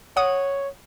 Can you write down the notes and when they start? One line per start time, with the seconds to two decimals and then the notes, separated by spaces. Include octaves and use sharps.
0.17 C#5 F#5 D#6